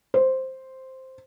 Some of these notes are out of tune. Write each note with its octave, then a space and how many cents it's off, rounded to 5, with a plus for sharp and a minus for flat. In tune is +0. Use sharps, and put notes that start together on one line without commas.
C5 +0